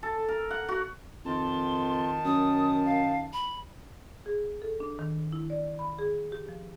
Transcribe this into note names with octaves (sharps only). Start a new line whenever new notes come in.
A4
A#4
F#5
F#4
F2 D#3 A5 C6
F#2 D#6
F5
B5
G#4
A4
D4
D#3
E4
D5
B5
G#4
G4
F3